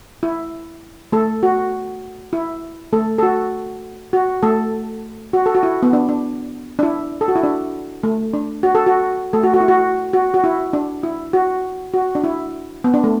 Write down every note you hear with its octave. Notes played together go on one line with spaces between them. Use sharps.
E4
A3 A4
F#4
E4
A3 A4
A4
F#4
F#4
A3 A4
F#4
A4
F#4
E4
B3
D4
D4
D4
E4
A4
F#4
E4
D4
A3
D4
F#4
A4
F#4
A3 A4
F#4
F#4
E4
F#4
F#4
F#4
E4
D4
E4
F#4
F#4
D4
E4
B3
D4
A3